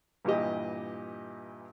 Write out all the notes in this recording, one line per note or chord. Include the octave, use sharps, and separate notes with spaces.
G2 A#2 E3 G4 D#5